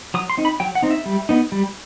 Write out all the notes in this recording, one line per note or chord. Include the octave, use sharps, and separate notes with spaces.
F#3 D#6
C6
C4 D#4
B5
F#3 G5
F#5
C4 D#4
E5
G3
B3 D#4
G3